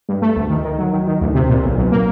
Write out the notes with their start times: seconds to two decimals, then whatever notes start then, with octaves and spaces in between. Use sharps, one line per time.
0.09 G2
0.22 A3
0.36 D2
0.50 D#3
0.64 D#3
0.79 F#3
0.93 D#3
1.07 D#3
1.21 D2
1.35 C3
1.50 A#2
1.64 B1
1.78 B1
1.92 A#3